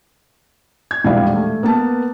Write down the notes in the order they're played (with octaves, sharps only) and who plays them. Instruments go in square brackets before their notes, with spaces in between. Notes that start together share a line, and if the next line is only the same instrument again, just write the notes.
[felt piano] G#6
E1 A#1 G3 E4 F5
A3
A#3 B3 B4 A5